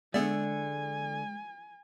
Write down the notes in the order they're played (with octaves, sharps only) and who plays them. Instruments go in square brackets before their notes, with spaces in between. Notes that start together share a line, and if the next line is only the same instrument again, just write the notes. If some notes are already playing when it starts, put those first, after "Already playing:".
[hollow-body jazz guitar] D3 E5 [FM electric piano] G#3 [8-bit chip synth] B3 D5 [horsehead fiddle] G#5